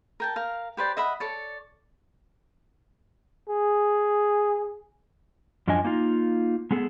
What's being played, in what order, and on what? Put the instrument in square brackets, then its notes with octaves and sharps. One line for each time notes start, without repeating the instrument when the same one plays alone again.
[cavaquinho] A#4 G5 A5
A#4 F5
G4 B4 C5 D5
D#5 E5 F#5 B5
A4 C#5 D5
[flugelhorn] G#4
[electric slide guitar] F#2 F3 D4 D#5 G#5
A#3 D#4 F4
G#3 B3 G#4 A4